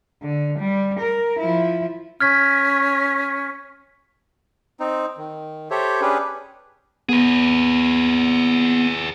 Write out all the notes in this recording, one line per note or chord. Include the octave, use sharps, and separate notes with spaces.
D3
G3
A#4
F3 E4
C#4 F6 G#6 B6
C4 D#4
D#3
G4 A4 C5 C#5 E5
C#4 D4 G4 G#4 B4
B3 G#4 B4